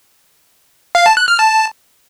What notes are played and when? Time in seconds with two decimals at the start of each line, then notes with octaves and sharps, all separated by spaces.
0.95 F5
1.06 A5
1.17 F#6
1.28 F6
1.39 A5